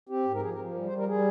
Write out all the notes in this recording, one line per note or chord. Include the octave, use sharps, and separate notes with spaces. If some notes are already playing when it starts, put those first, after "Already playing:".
C4 G4
G#2
A#4
F3 G#4
A#4
F3
G3
C5
G3
A#4
G3 G#4